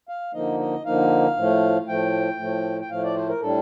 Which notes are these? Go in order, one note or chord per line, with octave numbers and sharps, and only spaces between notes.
F5
D3 F3 A#3 D#4 D#5
D#5
D3 F3 A#3 D#4 F5
A2 F3 A3
A2 F3 A3 G5
A2 F3 A3
G5
A2 F3 A3 F5
D5
C5
A#4
A2 G3 D4 A4